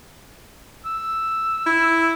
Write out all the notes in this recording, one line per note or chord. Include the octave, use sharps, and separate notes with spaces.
E6
E4